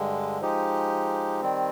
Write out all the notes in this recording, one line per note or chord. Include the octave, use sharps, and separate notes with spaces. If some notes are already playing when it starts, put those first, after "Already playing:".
Already playing: G2 D3 G#3
F3 G#3 D#4 G4
D#3 G3 C4